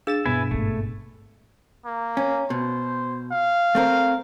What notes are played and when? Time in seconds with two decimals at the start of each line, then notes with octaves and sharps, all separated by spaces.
0.07 D4 G#4 F5 E6 A6 E7
0.26 G2 B2 B3 E4 B4 G#5
0.51 G#1 A3 A#3
1.86 A#3
2.17 C#4
2.50 B2 C5
3.32 F5
3.75 A3 C4 A#4